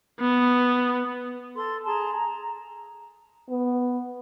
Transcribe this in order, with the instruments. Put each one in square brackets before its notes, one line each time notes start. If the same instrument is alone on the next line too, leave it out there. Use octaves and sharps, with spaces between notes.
[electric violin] B3
[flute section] A4 C6
G#4 A5 A#5 C6
A#5
[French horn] B3